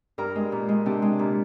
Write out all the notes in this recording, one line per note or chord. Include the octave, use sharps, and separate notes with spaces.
G2 A#4
G#3
A#2
G#3
C3 D4
G#3
A#2